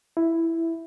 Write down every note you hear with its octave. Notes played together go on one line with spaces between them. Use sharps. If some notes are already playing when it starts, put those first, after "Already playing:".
E4